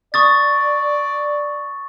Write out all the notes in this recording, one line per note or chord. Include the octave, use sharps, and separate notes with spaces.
D5 C#6 D#6 A6